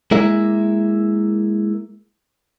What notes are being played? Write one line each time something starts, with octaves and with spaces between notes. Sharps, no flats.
G#3 A#3 E4 A#4 E5